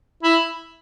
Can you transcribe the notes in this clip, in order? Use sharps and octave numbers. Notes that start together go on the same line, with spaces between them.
E4